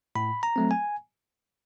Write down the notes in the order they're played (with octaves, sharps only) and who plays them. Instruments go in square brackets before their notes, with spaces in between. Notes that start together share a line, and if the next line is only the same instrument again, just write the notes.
[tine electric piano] A2 B5
A#5
F#3 A3 C4
G#5